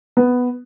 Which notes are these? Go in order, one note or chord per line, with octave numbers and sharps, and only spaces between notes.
B3